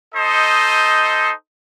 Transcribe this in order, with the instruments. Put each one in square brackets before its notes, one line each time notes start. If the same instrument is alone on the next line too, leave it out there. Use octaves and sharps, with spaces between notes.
[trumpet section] D#4 A4 C5 D#5